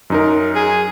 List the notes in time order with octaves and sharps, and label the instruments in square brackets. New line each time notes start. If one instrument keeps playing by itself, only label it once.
[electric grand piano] F#2 D#4 A#4
[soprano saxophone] G#4